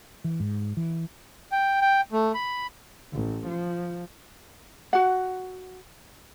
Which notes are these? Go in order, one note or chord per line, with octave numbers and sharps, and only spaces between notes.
E3
G#2
E3
G5
G5
A3
B5
A1
F3
F#4 F#5